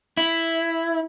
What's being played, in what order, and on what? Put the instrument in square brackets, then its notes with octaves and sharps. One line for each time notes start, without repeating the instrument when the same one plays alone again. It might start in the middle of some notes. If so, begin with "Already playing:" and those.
[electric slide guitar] E4